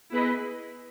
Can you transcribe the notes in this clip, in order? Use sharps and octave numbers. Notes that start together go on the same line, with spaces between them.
B3 E4 G#4 B4 D#5